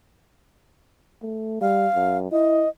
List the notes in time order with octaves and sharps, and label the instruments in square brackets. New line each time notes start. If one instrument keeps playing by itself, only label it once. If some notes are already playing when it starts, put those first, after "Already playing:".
[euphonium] A3
[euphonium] G3 [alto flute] F5
[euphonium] F#2
[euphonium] E4 [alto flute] D#5